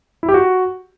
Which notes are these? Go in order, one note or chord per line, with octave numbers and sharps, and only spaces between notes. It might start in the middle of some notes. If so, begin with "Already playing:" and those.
E4
G4
F#4